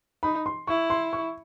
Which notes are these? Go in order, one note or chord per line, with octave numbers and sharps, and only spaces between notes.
D#4 B5
C6
E4 C#6
C6
C#6